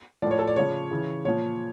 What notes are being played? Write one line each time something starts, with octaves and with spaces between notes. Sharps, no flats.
A2 F3 D5
C#5
A4
D5
C#3 F3 C#5
C#3 E3
A#2 F3 C#5